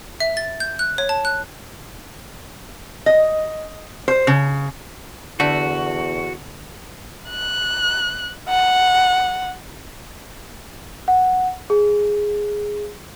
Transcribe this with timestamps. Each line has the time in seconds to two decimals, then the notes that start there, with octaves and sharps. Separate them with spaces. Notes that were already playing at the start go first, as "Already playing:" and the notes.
0.20 E5
0.37 A6
0.60 G6
0.79 F#6
0.98 C#5
1.09 A5
1.25 F#6
3.06 D#5
4.08 C5
4.27 C#3
5.40 E2 D3 A3 F#4
7.30 F#6
8.49 F#5
11.08 F#5
11.70 G#4